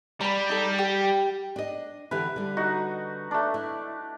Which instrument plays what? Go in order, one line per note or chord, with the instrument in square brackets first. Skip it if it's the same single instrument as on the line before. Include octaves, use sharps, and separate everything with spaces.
[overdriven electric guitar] G3 [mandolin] A#5 B5
[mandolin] D#4 A4
G4
[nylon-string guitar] D4 D#5
[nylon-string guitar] D3 E3 G4 [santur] B4
[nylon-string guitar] D3 G3
[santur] D#4 F#4
A3 D4
[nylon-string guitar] E4